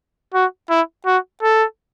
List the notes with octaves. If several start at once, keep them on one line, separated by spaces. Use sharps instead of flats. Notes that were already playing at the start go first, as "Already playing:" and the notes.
F#4
E4
F#4
A4